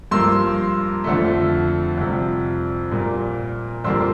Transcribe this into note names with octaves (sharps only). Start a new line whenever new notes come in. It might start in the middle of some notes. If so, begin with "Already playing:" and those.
G2 F3 A#3 C6 E6
F2 D3 A3
F2 C3 G3
A#2 G3 A#3
F2 D3 G3 A#3 C6 E6